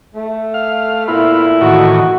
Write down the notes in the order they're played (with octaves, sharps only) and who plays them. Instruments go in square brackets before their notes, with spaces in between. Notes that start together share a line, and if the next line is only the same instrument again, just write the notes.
[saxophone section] A3
[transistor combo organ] F5
[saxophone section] A#2 A3 E4 [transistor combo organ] B3 F4
[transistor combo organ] A2 D#3 E3 [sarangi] F#4